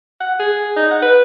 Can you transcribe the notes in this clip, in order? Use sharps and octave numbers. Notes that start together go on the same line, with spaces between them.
F#5
G#4
D#4
F#5
B4